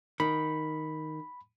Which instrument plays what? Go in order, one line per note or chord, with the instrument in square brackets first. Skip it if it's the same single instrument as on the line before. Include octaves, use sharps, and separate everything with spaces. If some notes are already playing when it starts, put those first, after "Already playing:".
[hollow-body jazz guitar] D#3 [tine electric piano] B5